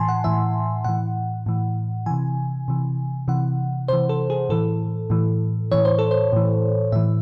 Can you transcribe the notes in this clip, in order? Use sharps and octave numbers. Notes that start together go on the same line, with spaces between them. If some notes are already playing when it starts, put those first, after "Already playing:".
Already playing: A2 E3 G#5 A5 C6
F#5
A2 E3 E5
A2 E3 F#5
A2 E3
C3 E3 G#5
C3 E3
C3 E3 F#5
C3 E3 C5
A4
G#4
A2 E3 A4
A2 E3
A2 E3 C#5
C5
A4
C5
A2 E3
A2 E3 E5